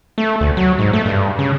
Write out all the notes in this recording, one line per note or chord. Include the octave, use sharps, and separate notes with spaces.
A3
D2
F#3
G#2
A3
G2
C#3